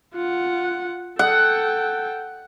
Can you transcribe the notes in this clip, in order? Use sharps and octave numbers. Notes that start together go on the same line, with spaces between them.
F4 F#5
A4 F#5 G5